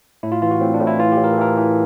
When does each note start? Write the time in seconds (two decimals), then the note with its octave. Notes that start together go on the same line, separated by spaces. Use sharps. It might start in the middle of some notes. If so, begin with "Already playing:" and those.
0.23 A2 E4
0.32 F4
0.42 E3 F4
0.51 F#4
0.61 A2 C4
0.74 D4
0.80 A2
0.87 E4
0.99 E3 F4
1.12 G4
1.17 A2
1.24 A#4
1.33 A4
1.38 E3 A#4
1.57 E3